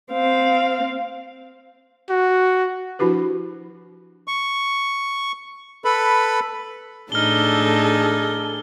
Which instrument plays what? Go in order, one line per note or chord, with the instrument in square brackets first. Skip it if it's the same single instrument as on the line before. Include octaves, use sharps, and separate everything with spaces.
[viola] C4 F5
[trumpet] F#4
[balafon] F3 D4 E4 F#4 G4 B4
[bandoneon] C#6
A4 B4 B5
[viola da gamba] A2 D4 D#4 [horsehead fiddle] G#4 A4 [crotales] F6 G7